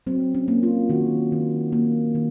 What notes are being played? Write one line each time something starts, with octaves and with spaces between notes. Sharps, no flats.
F#3 C4
C#4
A#3
F4
D#3 F#4
D#3
A#3
D#3